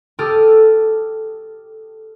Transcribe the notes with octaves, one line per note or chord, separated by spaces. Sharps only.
G4 A4 D6 D#6 F6